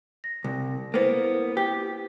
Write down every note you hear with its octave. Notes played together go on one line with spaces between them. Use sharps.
A#6
C2
A#3 B3 E4 C5
G4